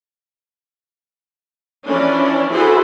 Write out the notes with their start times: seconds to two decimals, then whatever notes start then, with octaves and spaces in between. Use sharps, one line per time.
1.85 E3 F3 C#4 D4 E4
2.50 E4 F#4 G#4 A4 B4 C5